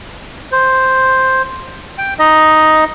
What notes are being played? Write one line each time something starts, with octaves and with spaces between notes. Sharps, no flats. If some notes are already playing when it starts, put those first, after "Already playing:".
C5
G5
D#4 D#5